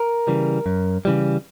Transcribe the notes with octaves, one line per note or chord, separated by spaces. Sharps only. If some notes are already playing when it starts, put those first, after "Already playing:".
Already playing: A#4
C#3 E3 G3
F#2
C#3 E3 G3